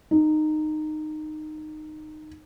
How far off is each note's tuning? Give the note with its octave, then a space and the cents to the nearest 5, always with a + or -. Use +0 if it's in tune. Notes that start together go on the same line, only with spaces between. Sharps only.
D#4 -15